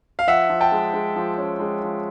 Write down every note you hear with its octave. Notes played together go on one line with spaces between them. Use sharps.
F5
F3 E5 F#5
F3
G5 A5
G#3
G#3
F3
C#4
G#3
F3